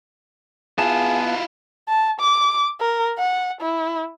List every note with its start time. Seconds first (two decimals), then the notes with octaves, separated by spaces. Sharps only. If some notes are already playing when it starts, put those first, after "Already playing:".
0.78 B3 E4 F4 G#4 A5
1.89 A5
2.20 D6
2.81 A#4
3.18 F#5
3.61 E4